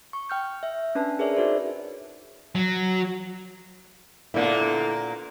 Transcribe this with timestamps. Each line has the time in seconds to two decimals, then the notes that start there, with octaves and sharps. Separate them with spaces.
0.13 C#6
0.30 G5 F6 G6
0.63 E5
0.95 C#4 D4 B4 A5
1.19 G#4 A#4 B4 C#5 D5 E5
1.36 D#4 F#4 A#4 C5 D5
2.55 F#3
4.34 A#2 D3 A#3 B3 D4 E4